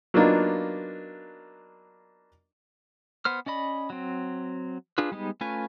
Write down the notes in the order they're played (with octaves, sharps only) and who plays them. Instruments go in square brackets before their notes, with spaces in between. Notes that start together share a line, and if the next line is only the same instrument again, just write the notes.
[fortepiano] F#3 A#3 B3 D4 D#4 F4
[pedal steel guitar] B3 C5 F6
C#4 D5 D#5 B5
F#3 C4
D4 F4 G#4 B4
G3 G#3 B3 D#4
A3 C#4 F4 B4 G#5